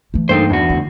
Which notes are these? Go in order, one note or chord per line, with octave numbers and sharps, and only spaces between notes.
E3 A3
G2 A#3 D#4 A4 C5 G5
E2 D4 F#4
D2